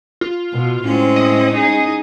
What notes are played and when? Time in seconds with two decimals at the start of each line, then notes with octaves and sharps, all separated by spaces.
0.21 F4
0.53 B2
0.84 A2 G#3 C4 C#4
1.16 D#5
1.52 D#4 G#4